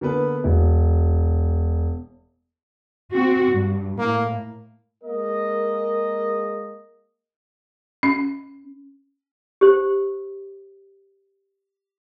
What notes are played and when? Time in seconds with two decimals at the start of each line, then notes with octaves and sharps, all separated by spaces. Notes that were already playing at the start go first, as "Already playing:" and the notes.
0.01 D3 A#3 B3 B4
0.44 E1
3.11 C4 F#4
3.51 G2
3.98 A2 A#3
5.04 G#3 A#3 A#4 D#5
8.03 C#4
9.61 G4 C5